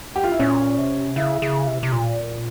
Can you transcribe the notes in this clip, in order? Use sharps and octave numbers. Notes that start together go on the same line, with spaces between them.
G4
F4
E4
A#2 C#4
C3
C#3 E4
C#3
C3
C3
A#2